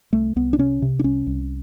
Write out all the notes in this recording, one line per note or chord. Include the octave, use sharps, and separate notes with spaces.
C2 A3
C2 B3
D4
C3 C#4
C3
D4
C2 C#4
C2